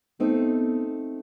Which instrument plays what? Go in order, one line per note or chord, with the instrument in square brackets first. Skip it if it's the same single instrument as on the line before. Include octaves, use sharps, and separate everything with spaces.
[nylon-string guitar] A3 C4 D#4 [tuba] B3